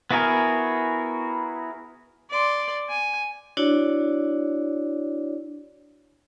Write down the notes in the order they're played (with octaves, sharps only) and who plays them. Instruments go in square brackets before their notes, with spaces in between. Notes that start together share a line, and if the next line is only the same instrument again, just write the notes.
[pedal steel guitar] B3 E4 F#4 G#4 A#4
[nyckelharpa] D5 C6
G#5
[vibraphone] D4 E4 F#4 C#5 D5